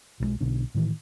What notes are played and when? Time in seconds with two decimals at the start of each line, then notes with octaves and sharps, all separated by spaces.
0.20 B1 E3 G#3
0.41 B1 B2 D3
0.75 A2 D#3 E3